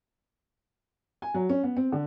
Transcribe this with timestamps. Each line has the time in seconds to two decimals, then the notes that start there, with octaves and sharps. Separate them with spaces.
1.22 G#5
1.34 F#3
1.49 C#4
1.63 B3
1.77 C4
1.92 D3